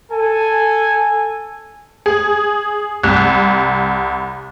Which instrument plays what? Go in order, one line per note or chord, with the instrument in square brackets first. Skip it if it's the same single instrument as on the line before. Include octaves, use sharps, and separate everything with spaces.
[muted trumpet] A4 [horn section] G#5
[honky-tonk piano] G#4
C2